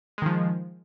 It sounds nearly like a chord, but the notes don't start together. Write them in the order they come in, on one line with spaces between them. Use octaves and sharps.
G#3 D#3 F3